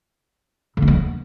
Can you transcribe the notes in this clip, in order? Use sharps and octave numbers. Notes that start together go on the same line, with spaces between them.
D3
C4
B3